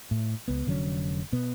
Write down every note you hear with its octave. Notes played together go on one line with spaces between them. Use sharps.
A2
C#2 B3
F1 D3 F#3 C#4
B2 B3